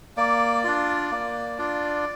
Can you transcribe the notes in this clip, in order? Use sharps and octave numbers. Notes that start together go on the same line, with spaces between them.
A#3 D5
D4 F4
A#3
D4 F4